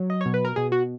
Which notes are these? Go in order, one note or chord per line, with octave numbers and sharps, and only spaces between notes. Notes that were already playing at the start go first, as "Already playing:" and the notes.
Already playing: F#3
D#5
B2 C#5
B4
A#4
B2 G#4
F#4